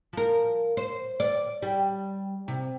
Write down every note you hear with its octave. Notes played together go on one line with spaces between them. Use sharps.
F3 A#4
C5
D5
G3
C3